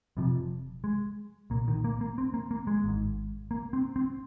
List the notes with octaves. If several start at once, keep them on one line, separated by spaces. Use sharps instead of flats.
F1 F2 C3 F3
G#3
C2 A#2 A#3
D#3
A#3
A#3
C4
A#3
A#3
G#3
G#1 G#2
A#3
C4
C4